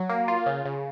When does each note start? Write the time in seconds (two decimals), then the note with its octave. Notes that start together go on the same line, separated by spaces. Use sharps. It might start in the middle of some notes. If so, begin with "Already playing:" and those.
Already playing: F#3
0.10 A#3
0.28 F4
0.46 C#3
0.65 C#3